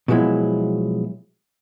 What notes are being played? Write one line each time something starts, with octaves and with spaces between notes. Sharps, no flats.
B2 F3 F#3 G#3 E4